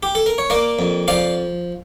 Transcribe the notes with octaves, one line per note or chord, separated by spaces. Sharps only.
G4
A4
A#4
C#5
A#3 A#4 D5
F2
F3 D5 F5